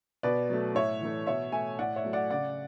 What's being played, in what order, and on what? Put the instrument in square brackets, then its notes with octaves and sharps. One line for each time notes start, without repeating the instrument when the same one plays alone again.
[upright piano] B2 B4 D5
F#3 A3
A2 C#5 E5
E3 A3
B2 C#5 E5
A3 E5 G#5
A2 D5 F#5
C#5 E5
F#3 A3
D5 F#5
C#3 D5 F#5